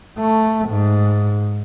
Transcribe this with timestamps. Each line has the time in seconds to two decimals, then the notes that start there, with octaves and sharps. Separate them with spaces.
0.18 A3
0.69 G#2